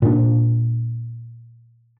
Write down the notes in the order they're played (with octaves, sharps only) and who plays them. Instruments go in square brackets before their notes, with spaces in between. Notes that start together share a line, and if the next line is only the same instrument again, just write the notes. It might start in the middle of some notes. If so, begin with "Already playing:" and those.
[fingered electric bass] A#2 D4